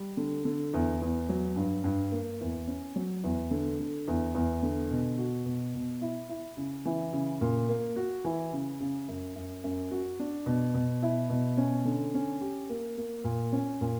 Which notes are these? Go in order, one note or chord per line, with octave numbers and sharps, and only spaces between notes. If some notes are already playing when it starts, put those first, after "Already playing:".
Already playing: G3
D3
D3
E2
E2
F#3
G2
G2
A#3
E2
C#4
F#3
E2
D3
D3
E2
E2
D3
B2
F#4
B2
B2
E4
E4
C#3
E3
C#3
A#2
A#3
F#4
E3
C#3
C#3
F#2
F#2
F#2
F#4
D4
B2
B2
E4
B2
C#4
D3
C#4
G4
A#3
A#3
A#2
C#4
A#2